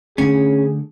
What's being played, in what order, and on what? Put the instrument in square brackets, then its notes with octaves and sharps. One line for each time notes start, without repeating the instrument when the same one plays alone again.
[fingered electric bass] D3 A3 [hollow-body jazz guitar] C#4 [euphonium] G#4